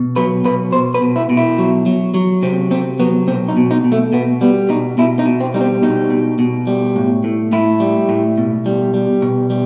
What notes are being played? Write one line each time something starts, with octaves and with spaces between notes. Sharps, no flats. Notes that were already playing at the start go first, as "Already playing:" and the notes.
Already playing: B2
F#3 B4
B2 B4
B2 C5
B4
B2
E4
B2
E4
F#3
F#3
F#3
C3 C4
C3 C4
F#3 B3
B2 C4
D#4
B2
D#4
B2
A3
B2 B3
G3 B3
B2 D#4
B2 E4
D#4
B2
C4
G3 D#4
C4
B2 D#4
B2
B2
G3
A2
A2
A2 E4
G3
A2
B2
G3
G3
B2
G3